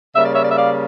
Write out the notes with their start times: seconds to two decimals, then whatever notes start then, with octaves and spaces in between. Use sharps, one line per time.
0.16 C#3 G3 A#3 E5
0.25 D5
0.34 C#5 E5
0.44 D5
0.50 E5
0.58 D5 F5